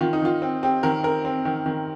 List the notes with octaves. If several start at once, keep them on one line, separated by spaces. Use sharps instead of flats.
D#3 F4
D#4
D#3 F4
C4
C4 G4
D#3 A#4
C4 A#4
C4
D#3
D#3